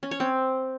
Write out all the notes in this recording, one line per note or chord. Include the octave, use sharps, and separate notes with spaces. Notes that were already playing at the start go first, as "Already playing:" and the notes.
C#4
C#5
C4